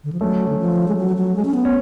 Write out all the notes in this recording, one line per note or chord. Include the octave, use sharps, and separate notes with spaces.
D3
F3
F#3 A3 C#4
D3
F3
G#3
F#3
F#3
G#3
C#4
B3
C#4